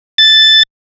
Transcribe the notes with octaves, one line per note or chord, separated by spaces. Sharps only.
A6